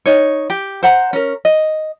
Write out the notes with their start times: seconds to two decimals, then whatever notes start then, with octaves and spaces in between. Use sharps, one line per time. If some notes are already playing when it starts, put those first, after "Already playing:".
0.06 D#4 C#5
0.50 G4
0.83 C5 F#5 A#5
1.13 C#4 A#4
1.45 D#5